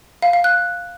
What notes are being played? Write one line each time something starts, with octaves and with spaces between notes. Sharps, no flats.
F5
F5
F#6